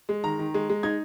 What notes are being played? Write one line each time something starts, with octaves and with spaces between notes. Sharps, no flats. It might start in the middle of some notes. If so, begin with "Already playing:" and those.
G#3
D#3 A#5
D#3
G#3
G#3
D#4 G#6